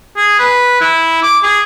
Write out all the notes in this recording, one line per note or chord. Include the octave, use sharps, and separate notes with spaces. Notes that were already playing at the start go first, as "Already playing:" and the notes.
G#4
B4
E4
D6
G#4